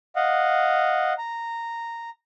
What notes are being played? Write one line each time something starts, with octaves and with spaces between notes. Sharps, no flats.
D#5 F5 F#5
A#5